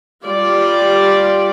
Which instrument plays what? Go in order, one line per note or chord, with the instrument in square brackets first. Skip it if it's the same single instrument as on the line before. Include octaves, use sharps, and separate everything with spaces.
[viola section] G3 F4 D5